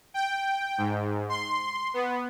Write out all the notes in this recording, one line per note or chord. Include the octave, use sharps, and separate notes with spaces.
G5
G#2
C6
B3